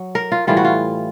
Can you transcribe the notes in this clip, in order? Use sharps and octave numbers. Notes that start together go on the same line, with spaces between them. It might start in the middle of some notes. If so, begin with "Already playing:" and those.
Already playing: F#3
A#4
F4
A2 E3 G3 F4
F#4
F4